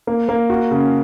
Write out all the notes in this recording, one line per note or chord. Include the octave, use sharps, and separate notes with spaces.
A#3
A#3
F#4
C#3